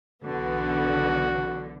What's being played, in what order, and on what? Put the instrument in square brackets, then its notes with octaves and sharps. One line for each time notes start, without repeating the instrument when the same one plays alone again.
[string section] B1 E3 B3 [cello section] D3 [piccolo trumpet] F#4